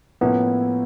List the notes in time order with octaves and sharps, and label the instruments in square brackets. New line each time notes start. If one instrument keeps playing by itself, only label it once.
[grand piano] A2 F3 A#3 C#4 E4 [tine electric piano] B3